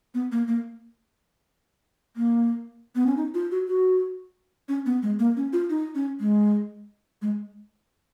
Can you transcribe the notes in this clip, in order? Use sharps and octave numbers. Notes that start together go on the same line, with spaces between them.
B3
A#3
A#3
A#3
B3
C#4
D#4
F4
F#4
F#4
C#4
B3
G#3
A#3
C#4
F4
D#4
C#4
G#3
G#3